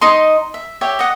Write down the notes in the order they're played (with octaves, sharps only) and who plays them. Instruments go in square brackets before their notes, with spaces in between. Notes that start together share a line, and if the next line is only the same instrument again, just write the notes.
[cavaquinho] D#4 D#5 C6
E5
G4 C#5 E5
D#5 F#5